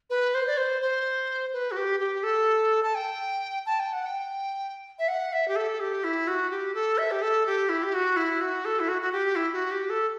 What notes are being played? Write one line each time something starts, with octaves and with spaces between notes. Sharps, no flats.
B4
C5
D5
C5
C5
B4
F#4
G4
G4
A4
A5
G5
A5
G5
F#5
G5
E5
F#5
E5
G4
A4
G4
E4
F#4
G4
A4
E5
G4
A4
G4
E4
G4
F#4
E4
F#4
A4
E4
F#4
F#4
G4
E4
F#4
G4
A4